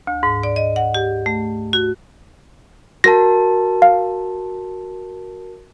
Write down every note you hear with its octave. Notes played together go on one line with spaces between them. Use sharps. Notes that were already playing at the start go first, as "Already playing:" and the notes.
D2
G#2
D5
D#5
F#5
G4
A3
F#4
F#4 A#4 A5 A#6
F5